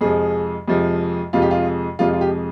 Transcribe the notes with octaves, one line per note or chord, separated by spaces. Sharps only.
F2 C3 F3 G#3 G#4
F2 C3 F3 G#3
F2 C3 F3 G#3 F4
G4
F4
F2 C3 F3 G#3 F4
F4
G4